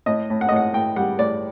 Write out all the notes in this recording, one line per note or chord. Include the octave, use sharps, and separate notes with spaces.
A2 D#5
A2
F#5
D#5
A2 F#5
A2 G5
G3 F#5
A2 D5